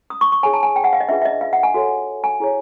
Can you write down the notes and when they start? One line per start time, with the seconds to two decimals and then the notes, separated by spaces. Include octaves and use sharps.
0.10 D#6
0.21 C#6
0.32 C#6
0.43 D#4 G#4 C#5 G#5
0.53 A5
0.63 G#5
0.76 G5
0.84 F#5
0.93 F5
1.00 D#5
1.09 D4 F4 G#4 B4 E5
1.22 E5
1.25 D#5
1.41 F5
1.53 F#5
1.63 G#5
1.74 F#4 A4 C#5
2.24 G#5
2.40 E4 G#4 C#5